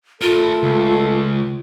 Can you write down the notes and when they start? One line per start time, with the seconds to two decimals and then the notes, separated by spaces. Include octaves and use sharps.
0.22 A3 F4 A4 A#4 A5
0.63 C#2